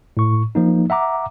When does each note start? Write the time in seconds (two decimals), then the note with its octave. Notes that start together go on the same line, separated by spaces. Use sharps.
0.17 A2 C#6
0.55 F3 A#3 D#4
0.90 E5 F#5 A#5 D6